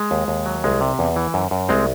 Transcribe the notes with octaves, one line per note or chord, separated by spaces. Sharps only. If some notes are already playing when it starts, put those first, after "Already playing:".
Already playing: G#3
D#2
D#2
F#3
C2 G#3
C3
E2
E3
F#2
F#2
C2 G#3 C4